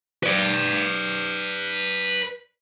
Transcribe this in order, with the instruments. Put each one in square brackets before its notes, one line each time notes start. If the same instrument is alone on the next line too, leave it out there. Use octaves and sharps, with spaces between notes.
[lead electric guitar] B4 D5